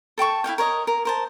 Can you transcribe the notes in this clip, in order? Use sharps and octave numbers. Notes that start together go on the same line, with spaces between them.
A4 G5 A5 C#6
E4 F#4 F5 G5
A#4 C#5 D#5
A#4
A#4 C5 A5